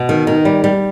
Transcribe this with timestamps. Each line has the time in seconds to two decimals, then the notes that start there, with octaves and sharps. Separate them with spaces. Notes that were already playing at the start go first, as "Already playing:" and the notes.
Already playing: B2
0.09 D#3
0.27 D#3
0.45 G3
0.64 G3